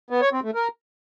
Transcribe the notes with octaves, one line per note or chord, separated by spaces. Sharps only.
B3
C#5
C4
A3
A#4